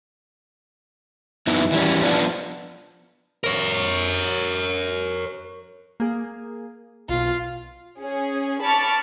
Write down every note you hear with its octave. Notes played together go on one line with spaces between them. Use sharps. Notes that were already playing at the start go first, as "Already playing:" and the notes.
F#2 B3 D#4 E4
E3 G3 C#4
F3 B3 D4
A#4 C#5
A#3 G#4
B1 B2 F4
C#4 G#4
A5 B5 C#6 D6 F6 A6